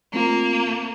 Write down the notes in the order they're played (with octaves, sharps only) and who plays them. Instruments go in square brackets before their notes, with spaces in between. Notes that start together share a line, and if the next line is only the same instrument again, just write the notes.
[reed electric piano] A3 C4 F4 [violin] A#3